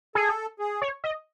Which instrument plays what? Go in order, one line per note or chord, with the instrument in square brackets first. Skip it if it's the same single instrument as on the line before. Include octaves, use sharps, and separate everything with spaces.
[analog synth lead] G#4 [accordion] A4
[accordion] G#4
[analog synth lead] C#5
D#5